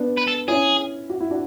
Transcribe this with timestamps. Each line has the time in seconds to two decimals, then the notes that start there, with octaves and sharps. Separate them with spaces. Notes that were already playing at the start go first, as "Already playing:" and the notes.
Already playing: B3 D4
0.18 B4
0.28 A4
0.48 C#4 E4 G#4
1.10 F#4
1.20 E4
1.31 D4 F#4